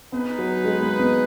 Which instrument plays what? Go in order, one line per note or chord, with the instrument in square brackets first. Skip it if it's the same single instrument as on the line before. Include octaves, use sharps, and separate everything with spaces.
[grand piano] B3 [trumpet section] D#4 G#4 B4
[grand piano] F#3
G#3
A#3
B3